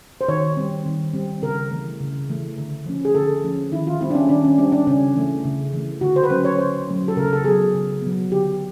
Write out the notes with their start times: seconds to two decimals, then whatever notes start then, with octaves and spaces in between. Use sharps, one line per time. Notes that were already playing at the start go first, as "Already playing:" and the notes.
0.21 C5
0.28 D#3 C#5
0.57 G3 C4
0.86 D#3
1.14 G3 C4
1.43 C#3 A#4
1.71 E3 A3
2.00 C#3
2.29 E3 A3
2.58 D3
2.86 F3 A3 C#4
3.05 G#4
3.15 D3 A4
3.44 F3 A3 C#4
3.72 D#3 E4
3.87 F4
4.00 G3 C4 E4
4.10 D4
4.15 C#4
4.29 D#3 D4
4.45 C#4
4.58 G3 C4 D4
4.72 D4
4.87 C#3 C#4
5.15 E3 A3
5.45 C#3
5.73 E3 A3
6.01 D3 F#4
6.16 C5
6.23 B4
6.30 F#3 A3 C#4 C5
6.45 C#5
6.58 D3 C5
6.87 F#3 A3 C#4
7.08 A4
7.17 C#3 A#4
7.33 A4
7.45 F#3 B3 G#4
7.74 C#3
8.02 F#3 B3
8.31 D3 G4